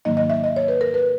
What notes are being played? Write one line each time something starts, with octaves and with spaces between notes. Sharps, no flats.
G#2 D#3 F#3 A#3 D#4 D#5
D#5
E5
D#5
C#5
B4
A#4
B4